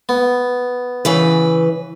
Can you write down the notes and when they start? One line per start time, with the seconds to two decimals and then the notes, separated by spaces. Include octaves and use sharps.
0.09 B3
1.05 C#3 E3 B4